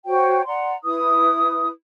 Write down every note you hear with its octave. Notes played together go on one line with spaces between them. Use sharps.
F#4 C5 C#5 G5
D5 F#5 A#5 C6
E4 B4 D#6